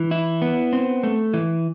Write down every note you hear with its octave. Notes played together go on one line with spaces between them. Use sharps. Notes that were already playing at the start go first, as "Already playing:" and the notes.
Already playing: E3
E4
B3
C4
A3
E3